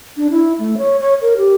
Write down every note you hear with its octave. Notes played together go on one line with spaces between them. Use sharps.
D4
E4
A3
C#5
C#5
A#4
G4